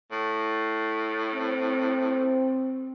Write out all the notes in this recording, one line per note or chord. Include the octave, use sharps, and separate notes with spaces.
A2
C4